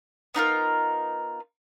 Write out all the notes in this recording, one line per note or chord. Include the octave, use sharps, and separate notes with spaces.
B3 D#4 F4 A#4